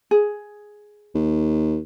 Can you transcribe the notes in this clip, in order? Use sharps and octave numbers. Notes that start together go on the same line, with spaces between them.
G#4
D#2